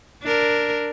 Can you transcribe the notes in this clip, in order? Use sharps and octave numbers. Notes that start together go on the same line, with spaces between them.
D4 A#4